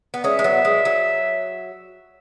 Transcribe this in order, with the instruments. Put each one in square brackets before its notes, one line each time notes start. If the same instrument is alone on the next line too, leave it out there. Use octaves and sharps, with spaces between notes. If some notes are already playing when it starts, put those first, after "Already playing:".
[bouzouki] B3
[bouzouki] G#3 C#4 [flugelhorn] E5
[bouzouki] G#3
F#3 B3
G#3
F#3